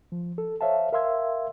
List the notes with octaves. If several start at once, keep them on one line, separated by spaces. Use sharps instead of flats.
F3
A4
C5 C#5 E5 F5 A5
A#4 E5 F5 C6 E6 G#6